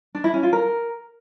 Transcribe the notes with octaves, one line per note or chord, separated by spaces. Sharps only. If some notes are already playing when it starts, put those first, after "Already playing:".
D4
E4
C#4
F4
A#4